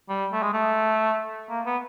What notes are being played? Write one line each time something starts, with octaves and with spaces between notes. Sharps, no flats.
G3
A3
G#3
A3
A#3
B3